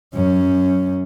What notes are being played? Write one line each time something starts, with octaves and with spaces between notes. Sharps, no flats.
F#2 C#4